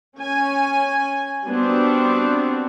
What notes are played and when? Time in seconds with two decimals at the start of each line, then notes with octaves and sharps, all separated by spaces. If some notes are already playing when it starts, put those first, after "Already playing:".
0.16 C#4 G#5
1.47 G3 B3 C4 D4 F#4